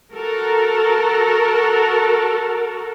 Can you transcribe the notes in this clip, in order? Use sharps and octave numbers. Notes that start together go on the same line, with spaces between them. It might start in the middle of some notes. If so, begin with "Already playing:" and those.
F#4 A4 A#4